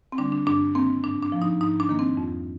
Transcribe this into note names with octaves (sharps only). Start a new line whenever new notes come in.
C4
D3 G3 A#3 D4
D4
G2 D4
D#3 A#3 C4
G#2 D4
D4
F3 A#3
D#4
G#2 D#4
D4
D#3 A#3
C4
F2